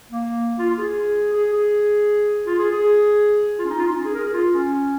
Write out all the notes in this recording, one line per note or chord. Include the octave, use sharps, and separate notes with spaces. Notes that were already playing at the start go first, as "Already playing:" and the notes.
A#3
F4
F4
G#4
G#4
G#4
F4
G#4
G#4
F4
C#4
D#4
F4
D#4
C#4
G#4
A#4
G#4
F4
C#4